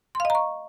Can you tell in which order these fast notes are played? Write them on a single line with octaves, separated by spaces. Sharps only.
C6 F5 D#5 A#5 C#6